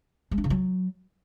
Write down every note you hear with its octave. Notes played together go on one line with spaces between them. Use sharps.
G#3
D4
C#3
F#3